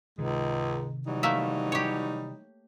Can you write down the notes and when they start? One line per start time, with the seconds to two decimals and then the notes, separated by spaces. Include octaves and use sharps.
0.18 C#2 G#2 C3 D#3 G#3 D#4
1.06 E3 F#3 G3 D#4
1.23 A3 A#3 E5
1.72 G4 C#5